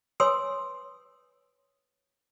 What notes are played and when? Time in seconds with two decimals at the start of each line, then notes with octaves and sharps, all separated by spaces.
0.20 B4 C#5 G#5 C6 D#6 E6